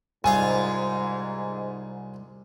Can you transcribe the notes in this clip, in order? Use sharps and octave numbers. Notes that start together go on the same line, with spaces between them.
C2 G#2 F4 F5 G#5